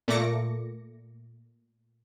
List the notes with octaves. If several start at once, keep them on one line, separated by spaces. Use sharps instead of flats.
A#2 A3 A#3 D6 A#6 C#7